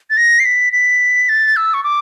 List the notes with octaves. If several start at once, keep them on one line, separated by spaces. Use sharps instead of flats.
A6
A#6
C7
B6
B6
A6
E6
C#6
D6